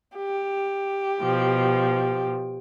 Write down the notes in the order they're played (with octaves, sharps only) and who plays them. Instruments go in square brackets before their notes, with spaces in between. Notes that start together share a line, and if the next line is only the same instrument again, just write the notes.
[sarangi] G4
[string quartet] B2 F3